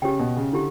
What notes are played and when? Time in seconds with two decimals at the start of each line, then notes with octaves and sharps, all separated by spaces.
0.02 C#3 G4 C#5 G5
0.19 B2
0.37 C#3
0.53 D3 E4 G4